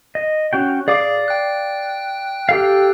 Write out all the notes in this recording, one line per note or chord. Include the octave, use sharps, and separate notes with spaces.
D#5
C#4 F#4 G5
G#4 D5 F5 D6
G5 F#6
G4 A4 F5